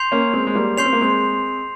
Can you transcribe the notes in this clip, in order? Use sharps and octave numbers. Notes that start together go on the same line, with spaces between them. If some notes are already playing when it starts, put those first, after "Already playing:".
Already playing: C6 G6 C7 F7
A#3 C#4
G#3 C4
G#3
G3 A#3
C#4 C6 G6 C7 F7
C4
A#3
G#3 C4